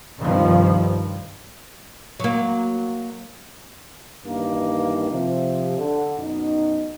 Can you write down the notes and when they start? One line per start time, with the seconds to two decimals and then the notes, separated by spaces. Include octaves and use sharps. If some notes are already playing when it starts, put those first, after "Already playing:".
0.21 C2 G2 D#3 F3
2.20 F#3 A#3
4.25 G2 D#3 E3 A#3
5.11 C3 F3
5.77 D3
6.18 F#2 B2 D#4